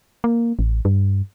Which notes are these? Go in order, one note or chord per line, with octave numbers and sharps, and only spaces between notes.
A#3
A1
G2